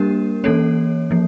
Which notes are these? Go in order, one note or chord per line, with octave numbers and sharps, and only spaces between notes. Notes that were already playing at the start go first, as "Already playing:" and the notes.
Already playing: G3 A#3 D4 G4 A#4
E3 A#3 C#4 A4 C#5
F3 A#3